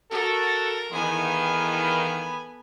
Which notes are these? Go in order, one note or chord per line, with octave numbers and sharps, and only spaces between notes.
F#4 A4 A#4
D#3 E3 B3 G#4 A4 F5 G#5 B5